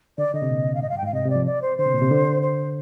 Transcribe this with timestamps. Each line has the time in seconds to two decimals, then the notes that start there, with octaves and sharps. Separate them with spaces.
0.18 D3 D5
0.34 D3 D#5
0.42 C3
0.50 A#2
0.75 F5
0.81 G#2 D#5
0.89 G2 F5
0.98 G5
1.03 G#2
1.06 F5
1.13 C3 D#5
1.25 C3
1.30 D5
1.35 F3
1.46 D5
1.62 C5
1.78 D3 C5
1.86 C3
1.95 A#2
2.02 C3
2.11 D3
2.42 C5